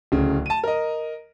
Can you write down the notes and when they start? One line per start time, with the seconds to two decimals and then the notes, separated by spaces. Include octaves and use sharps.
0.12 D1 C#3
0.46 A5 D#7
0.64 A#4 D#5